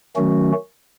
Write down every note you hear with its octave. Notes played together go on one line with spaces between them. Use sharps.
D#3 F#3 A3 C#4 F#4